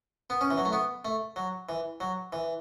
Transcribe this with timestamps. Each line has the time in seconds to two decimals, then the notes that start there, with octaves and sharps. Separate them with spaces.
0.30 B3
0.41 C#4
0.50 E3
0.58 F#3
0.65 A3
0.73 B3
1.05 A3
1.36 F#3
1.69 E3
2.00 F#3
2.33 E3